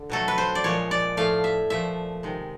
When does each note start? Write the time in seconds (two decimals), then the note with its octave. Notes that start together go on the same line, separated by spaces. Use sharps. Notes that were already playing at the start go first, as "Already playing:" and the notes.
Already playing: D3
0.10 B2 F#3 A3 A4
0.28 B4
0.38 C5
0.55 D5
0.64 A#2 F3 G#3 C#5
0.91 D5
1.17 A2 F3 A3 F5
1.44 E5
1.70 A#2 F3 A3 E5
2.23 C3 D#3 G#3